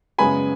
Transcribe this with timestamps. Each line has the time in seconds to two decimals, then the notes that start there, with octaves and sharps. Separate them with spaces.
0.18 F#2 C#3 G#3 B3 G#5 B5